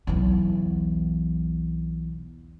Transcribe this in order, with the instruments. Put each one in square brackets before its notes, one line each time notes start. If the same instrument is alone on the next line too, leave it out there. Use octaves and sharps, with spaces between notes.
[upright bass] B1 E2